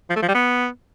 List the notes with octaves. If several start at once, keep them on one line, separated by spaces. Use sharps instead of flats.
F3
A3
F3
G3
B3